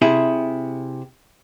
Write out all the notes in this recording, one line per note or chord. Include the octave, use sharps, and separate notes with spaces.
C3 E4 G#4